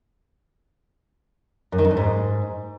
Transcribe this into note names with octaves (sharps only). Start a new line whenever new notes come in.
F#2
D#3
F2
E2
G#2